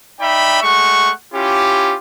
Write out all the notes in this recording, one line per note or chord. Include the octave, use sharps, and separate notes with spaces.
D#4 D5 E5 G5 B5
G#3 A3 F#5 C#6
C#4 E4 F4 G4